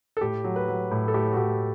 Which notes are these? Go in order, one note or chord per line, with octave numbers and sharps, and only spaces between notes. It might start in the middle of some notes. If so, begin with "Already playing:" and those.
A4
A2 G4
F#3
B4
F#3
A2
A4
A2 G4
F#4
A2 G4